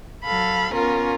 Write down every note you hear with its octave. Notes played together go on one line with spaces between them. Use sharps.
F#3 A4 F5 B5
B3 C#4 F4 A#4